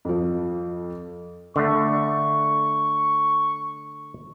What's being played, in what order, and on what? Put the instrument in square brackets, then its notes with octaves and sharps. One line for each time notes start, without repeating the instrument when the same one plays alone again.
[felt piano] F2 F3
[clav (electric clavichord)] D3 A3 [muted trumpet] C#6